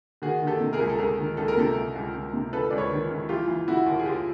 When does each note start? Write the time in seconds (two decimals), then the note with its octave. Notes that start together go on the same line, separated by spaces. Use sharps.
0.22 D#3 F#4 G#4
0.42 D#3
0.47 G4 A4
0.60 C3
0.73 G#4 A#4
0.80 C#2
0.89 A4
0.99 C#2 G#4 A#4
1.19 D#3
1.37 C#2 A4
1.48 A#4
1.57 C3 G4 A4
1.76 C#2
1.95 C#2
2.14 C#2
2.33 C3
2.53 C#2 A4 B4
2.70 C#2 D5
2.78 B4 C#5
2.91 D#3
3.11 C#2
3.29 E3 F4 G4
3.48 E3
3.68 C#3 E4 F#4
3.86 D#2
3.99 G#4
4.06 D#2 F4 G4